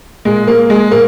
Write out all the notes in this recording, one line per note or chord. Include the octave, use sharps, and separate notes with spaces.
A#2 G#3
A#3
G#3
A#2 A#3